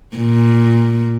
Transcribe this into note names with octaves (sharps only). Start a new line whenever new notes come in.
A#2